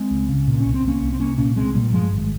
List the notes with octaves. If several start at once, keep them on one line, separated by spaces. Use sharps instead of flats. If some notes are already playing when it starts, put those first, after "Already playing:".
Already playing: G#3 C4
C#2
C#3
A#2
C2 C#4
C4
C2 A#3 C#4
C2
C4
C2 A#3 C#4
A#2 A#3 C#4
C2 G#3 C4
A#2 G3 A#3
G2 F3 G#3
G#1
G#3